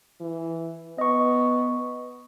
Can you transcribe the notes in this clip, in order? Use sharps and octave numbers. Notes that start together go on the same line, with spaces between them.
E3
B3 D#5 C#6